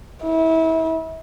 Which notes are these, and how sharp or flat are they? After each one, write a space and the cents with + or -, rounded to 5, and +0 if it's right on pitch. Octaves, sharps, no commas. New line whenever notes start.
E4 -30